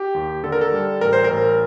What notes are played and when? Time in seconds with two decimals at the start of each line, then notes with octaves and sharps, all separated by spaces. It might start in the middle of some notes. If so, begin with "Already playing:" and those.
Already playing: G4
0.14 D#2
0.43 D3 A4
0.52 A#4
0.61 A4
0.72 G3
1.01 A1 A#4
1.13 C5
1.24 A#4
1.31 A1